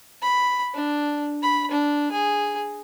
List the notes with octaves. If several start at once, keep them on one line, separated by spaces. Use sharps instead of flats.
B5
D4
B5
D4
G#4